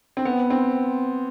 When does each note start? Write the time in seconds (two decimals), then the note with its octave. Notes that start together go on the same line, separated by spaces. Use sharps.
0.17 C4
0.25 B3
0.50 C4